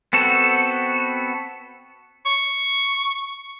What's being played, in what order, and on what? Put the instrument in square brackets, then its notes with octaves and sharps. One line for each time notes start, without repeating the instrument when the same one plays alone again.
[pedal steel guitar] B3 C4 F#4 A4
[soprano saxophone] C#6